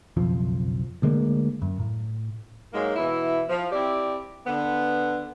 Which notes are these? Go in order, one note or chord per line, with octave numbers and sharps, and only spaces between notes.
F#1 B1 F2 F3
D2 D3 G#3 A#3
F#2
A2
G#2 F#3 G#3 A#3
B2 E3 E4
F3
C4 E4 G4 D5
D3 B3